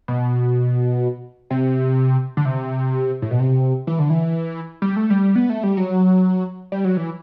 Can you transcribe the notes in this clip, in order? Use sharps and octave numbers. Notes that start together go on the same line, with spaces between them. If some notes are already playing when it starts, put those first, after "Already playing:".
B2
C3
D3
C3
A2
B2
C3
E3
D3
E3
G3
A3
G3
B3
A3
G3
F#3
G3
F#3
E3